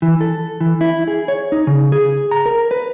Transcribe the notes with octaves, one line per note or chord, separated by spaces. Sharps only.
E3
A4
E3
E4
G#4
C#5
D#4
C#3
G#4
A#5
A#4
B4